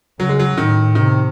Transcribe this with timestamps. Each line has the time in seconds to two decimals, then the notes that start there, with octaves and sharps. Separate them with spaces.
0.20 C#3 F#3
0.29 G#3
0.39 F#3
0.57 A2 D#3
0.95 C3 D#3